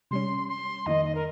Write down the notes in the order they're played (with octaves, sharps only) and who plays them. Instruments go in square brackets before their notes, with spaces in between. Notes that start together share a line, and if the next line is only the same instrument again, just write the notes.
[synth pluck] C3 G3 C#4 [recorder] C6
[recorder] C6
[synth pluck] F2 D#3 A#3 D#4 [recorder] D#5
[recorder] D#5
A#4